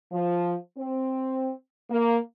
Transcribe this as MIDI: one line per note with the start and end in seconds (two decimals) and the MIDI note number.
0.11 0.54 53
0.77 1.51 60
1.90 2.16 58